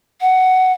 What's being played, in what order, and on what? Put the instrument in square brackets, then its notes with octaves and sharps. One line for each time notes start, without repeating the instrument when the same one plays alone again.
[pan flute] F#5